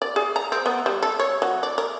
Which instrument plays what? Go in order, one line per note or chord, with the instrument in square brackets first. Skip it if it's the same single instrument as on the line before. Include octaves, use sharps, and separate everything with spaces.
[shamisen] D5
G#4
A#5
C4
B3
G3
A4
C#5
F#3
D5
A#4